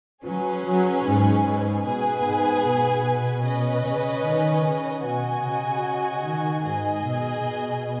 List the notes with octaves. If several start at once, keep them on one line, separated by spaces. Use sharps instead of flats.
F#3 C#4 G#4 B4
F#3
G#2
G#2
B2 B3 G#4 B4 G#5
G#2
B2
C#4 B4 D#5
C#3
D#3
C#3
B2 F#4 D#5 G#5
C#3
D#3
G#2 G#4 D#5 G#5
B2
B2